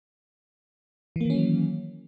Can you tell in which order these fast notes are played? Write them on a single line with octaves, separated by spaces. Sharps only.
E3 A#3 D#3 C#4 F#3